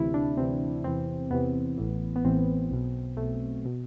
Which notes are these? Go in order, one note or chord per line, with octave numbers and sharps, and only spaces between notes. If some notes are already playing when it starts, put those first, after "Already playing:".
Already playing: D2 C3 E3 E4
D4
D2 C3 E3 C4
E2 C3 E3 C4
E2 C3 E3 B3
A1 A2 E3
B3
A1 A2 E3 C4
B1 B2
B1 B2 A3
B2